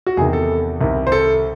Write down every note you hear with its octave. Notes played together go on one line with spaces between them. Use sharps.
F#4
E2 C3 D#3 G#4
A4
C2 C3 D#3
C5
A4